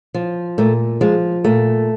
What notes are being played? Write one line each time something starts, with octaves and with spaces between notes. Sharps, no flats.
F3
A#2 A3
F3 G#3
A#2 A3